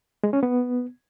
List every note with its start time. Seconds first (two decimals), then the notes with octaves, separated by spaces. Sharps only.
0.24 G#3
0.33 C#4
0.43 B3